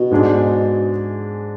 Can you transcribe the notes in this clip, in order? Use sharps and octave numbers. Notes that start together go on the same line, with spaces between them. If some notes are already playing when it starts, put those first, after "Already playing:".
Already playing: B2
G#2 G#3 D4 G#4